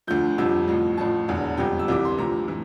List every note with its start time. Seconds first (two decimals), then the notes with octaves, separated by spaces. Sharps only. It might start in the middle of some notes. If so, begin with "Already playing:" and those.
0.07 D2 D3 F3 G6
0.38 G1 F2 C3 F3 E6
0.68 A1 A2 F3
0.97 A1 A2 F3 A5
1.28 E1 E2 D3
1.57 G1 F2 C3 G5
1.79 E6
1.88 C2 C3 E3 D6
2.05 C6
2.18 D2 C3 F3 A#5
2.48 A2 E3